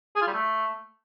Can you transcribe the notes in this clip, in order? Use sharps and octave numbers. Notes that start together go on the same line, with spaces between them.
G#4
F4
G3
A3